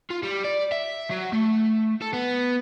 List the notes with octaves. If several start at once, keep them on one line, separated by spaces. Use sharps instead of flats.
F4
G3
D5
E5
F#3
A3
A4
B3